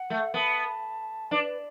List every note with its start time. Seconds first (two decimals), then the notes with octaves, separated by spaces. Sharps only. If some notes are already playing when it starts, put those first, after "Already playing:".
Already playing: F#5
0.10 A3
0.34 B3 A5
1.31 D4 B4